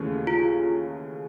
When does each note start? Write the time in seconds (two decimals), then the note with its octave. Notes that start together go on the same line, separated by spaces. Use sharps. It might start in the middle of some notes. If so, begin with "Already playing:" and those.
Already playing: D#2 C#3 E3 A3 C#4
0.27 F4